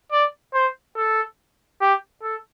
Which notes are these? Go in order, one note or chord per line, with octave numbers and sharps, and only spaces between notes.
D5
C5
A4
G4
A4